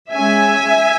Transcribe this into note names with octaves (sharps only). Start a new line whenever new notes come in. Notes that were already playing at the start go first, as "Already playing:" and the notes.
G#3 C#4 E5 G#5